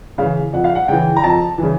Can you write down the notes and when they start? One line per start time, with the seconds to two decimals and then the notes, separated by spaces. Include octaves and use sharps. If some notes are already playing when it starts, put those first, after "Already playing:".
0.18 C#3 E3 F5
0.53 F2 F#5
0.64 F5
0.75 F#5
0.88 C#3 E3 G5
1.16 A#5
1.24 F2 A5
1.58 C#3 E3